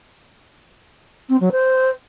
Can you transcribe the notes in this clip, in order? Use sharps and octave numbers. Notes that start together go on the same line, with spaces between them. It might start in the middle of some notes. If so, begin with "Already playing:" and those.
C4
F#3
C5